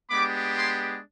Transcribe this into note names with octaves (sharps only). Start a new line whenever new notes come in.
G#3 B3 D4 G4 B5 D6
G#5 C6